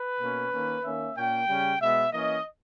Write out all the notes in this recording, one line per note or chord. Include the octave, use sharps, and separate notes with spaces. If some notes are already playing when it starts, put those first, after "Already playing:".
Already playing: B4
B2 A#3 C#4
D#3 A#3 C#4
D#3 A#3 C#4 E5
A#2 A#3 C#4 G5
C#3 G3 C#4
B2 G#3 B3 E5
E3 A#3 C#4 D#5